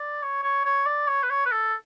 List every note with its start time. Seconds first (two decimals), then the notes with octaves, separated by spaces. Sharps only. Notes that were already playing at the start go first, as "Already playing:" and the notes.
Already playing: D5
0.23 C#5
0.43 C#5
0.65 C#5
0.86 D5
1.08 C#5
1.23 B4
1.30 C#5
1.46 B4
1.52 A4